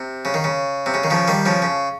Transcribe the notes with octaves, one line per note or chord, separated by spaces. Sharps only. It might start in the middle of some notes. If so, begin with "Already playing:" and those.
Already playing: C3
C#3
D#3
C#3
C3
C#3
D#3
C#3 F3
D#3 G3
C#3 F3
C#3